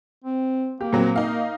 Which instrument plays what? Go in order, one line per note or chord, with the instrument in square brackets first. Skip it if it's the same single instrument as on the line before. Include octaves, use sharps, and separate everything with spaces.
[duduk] C4
[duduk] A#3 [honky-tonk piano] G4
[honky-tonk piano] A#2 F#3 C4
D#4 F5